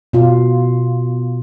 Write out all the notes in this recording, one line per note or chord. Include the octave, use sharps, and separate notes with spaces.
B2 F4